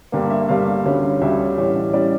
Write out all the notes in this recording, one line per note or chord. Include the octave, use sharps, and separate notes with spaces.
G2 D3 G3 A#3 G4
E5
G2 D3 G3 A#3 F5
D2 D3 G3 C#4
D2 D3 G3 C#4 E5
A1 A2 G3 C#4
A2 G3 C#4 D5